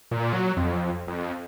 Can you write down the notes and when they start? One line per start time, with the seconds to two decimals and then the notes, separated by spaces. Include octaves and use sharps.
0.11 A#2
0.33 F#3
0.57 F2
1.07 F2